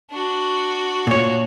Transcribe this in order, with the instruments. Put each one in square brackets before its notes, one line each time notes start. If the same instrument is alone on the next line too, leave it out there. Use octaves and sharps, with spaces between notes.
[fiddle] D4 F#4
[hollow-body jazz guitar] A#2 C#5